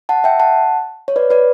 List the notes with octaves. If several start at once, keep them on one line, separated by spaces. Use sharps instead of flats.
F#5 A5
E5 G5
F#5 A5
C#5
B4 D5
B4 D5